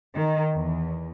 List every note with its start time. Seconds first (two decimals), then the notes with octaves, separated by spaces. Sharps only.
0.14 D#3
0.53 E2